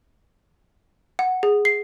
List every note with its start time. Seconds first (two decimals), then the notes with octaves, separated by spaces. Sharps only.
1.19 F#5
1.43 G#4
1.65 C7